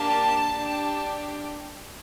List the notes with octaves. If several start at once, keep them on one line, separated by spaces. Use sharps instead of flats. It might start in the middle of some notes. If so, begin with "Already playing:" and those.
Already playing: A#3 D4 G4 A5
D4 G4